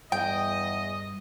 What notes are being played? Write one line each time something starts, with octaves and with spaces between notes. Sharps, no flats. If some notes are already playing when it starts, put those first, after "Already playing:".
E2 G2 D#5 G5